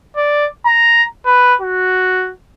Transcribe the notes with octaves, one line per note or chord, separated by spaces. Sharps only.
D5
A#5
B4
F#4